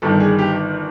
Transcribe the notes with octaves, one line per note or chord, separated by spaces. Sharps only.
G1 G2 D#3 A4
G#4
G4